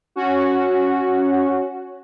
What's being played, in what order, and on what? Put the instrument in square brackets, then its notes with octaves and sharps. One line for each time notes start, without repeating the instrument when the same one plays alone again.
[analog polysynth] C#4 F#4